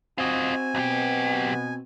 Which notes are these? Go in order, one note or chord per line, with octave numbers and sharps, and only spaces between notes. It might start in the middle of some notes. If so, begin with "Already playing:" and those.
C4 F4 F#4 D#5 G#5
B1 B2 G4